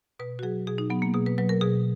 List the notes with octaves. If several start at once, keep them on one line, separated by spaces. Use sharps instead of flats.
B2 B4
F#4
F#3 G#4
B2 G#4
D#4
F#3 B3
A#3
B2 G#4
B4
F#3 B4
A#4
B2 G#4